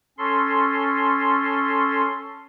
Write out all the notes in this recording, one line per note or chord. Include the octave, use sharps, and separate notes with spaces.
C#4 A4 C6